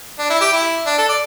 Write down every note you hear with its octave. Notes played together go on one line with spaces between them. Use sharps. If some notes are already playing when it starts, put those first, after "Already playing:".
D4
E4
G4
E4
D4
A4
D5